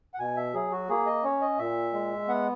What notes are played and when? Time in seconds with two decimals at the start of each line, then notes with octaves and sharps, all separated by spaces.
0.14 F#5
0.19 B2 G#5
0.37 E5
0.54 F#3 G#4
0.72 F#4
0.89 A#3 G#4
1.06 D#5
1.24 C#4 C#5
1.41 D#5
1.59 A#2 E5
1.93 G#3
2.28 B3 F#5